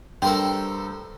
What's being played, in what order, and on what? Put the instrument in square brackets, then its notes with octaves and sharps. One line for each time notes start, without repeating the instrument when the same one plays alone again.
[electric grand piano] G2 [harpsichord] A4 A#4 C5 [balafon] G5